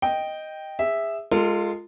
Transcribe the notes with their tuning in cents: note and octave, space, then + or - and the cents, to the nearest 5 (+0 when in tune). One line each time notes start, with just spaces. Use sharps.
D#5 +0 G5 +0
G#4 -25 E5 +0
G#3 +0 F4 +0 A4 +45